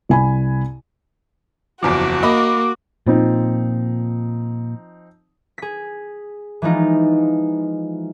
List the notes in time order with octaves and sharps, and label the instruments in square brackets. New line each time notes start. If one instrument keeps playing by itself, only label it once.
[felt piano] C2 G#5 B5
[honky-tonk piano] F#1 E2 F3 [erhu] F#4 [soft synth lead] D6
[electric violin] A#3 [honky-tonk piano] D#5 B5
[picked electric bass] A#2 [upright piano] F3 C4 D#4
[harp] G#4 B6
E3 F3 G#3 D#4 F4